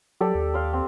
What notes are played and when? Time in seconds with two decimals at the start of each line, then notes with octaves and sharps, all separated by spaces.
0.20 F#3 G4 A4 D5
0.35 D#2
0.54 F5 C6
0.73 C4